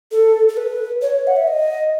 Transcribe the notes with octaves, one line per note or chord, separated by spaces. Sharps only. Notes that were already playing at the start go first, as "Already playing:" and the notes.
A4
A4
B4
C#5
F#5
E5
D#5